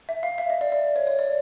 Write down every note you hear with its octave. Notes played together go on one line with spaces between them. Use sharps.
E5
F5
E5
D#5
D5
D5
C#5
C#5
D5